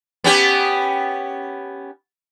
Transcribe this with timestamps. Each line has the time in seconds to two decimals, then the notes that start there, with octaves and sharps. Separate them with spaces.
0.24 B3 C#4 G4